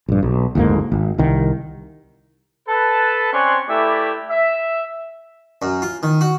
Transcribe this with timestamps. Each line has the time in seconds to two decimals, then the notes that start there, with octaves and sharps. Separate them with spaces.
0.08 A#1 G2
0.23 B1
0.55 F#1 D2 G#2 A#3
0.92 G#1
1.18 C2 D#3
2.68 A4 B4 A5
3.33 C4 C#4 C#5 D5 F#5 C6
3.69 A3 E4 G4 B4 D5
4.30 E5
5.62 F#2
5.82 F4
6.03 D#3
6.21 F#4